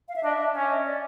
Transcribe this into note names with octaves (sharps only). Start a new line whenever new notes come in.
F5
E5
D4 D#5
E5
C#4 E5
D#5
D5